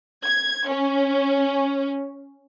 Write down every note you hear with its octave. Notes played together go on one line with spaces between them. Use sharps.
G#6
C#4